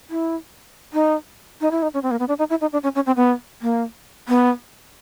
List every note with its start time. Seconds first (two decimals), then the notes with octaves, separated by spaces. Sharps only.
0.10 E4
0.93 D#4
1.61 D#4
1.71 E4
1.82 D#4
1.94 C#4
2.03 C4
2.11 A#3
2.19 B3
2.28 D4
2.39 D#4
2.50 E4
2.61 D#4
2.72 D4
2.83 C#4
2.95 C#4
3.06 C4
3.16 B3
3.62 A#3
4.28 B3